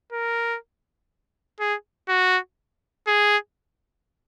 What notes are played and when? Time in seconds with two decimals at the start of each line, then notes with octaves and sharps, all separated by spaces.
0.13 A#4
1.60 G#4
2.09 F#4
3.07 G#4